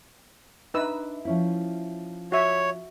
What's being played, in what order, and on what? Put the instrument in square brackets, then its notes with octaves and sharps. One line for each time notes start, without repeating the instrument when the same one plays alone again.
[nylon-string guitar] D4 E5 [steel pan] D#4 B4 E6
[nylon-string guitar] F3 C#4 E4
[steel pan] F#4 E5 [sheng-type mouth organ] C#5